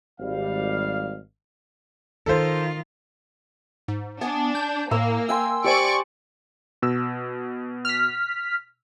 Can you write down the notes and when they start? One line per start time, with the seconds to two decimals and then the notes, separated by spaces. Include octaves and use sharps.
0.20 G#1 G3 F5
2.26 D#3 F4 A4 C5
3.88 G#2
4.21 B3 D4 G#5
4.55 G6
4.91 A2 A#3 E6
5.29 G5 G#5 C6 E6
5.64 G4 C5 D5 G#5 C#6 D7
6.82 B2 E6
7.85 F6 B6